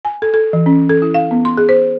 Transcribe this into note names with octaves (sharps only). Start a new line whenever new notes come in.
G#5
A4
A4
E3
C#4
A4
E4
F5
B3
C6
G#4
C5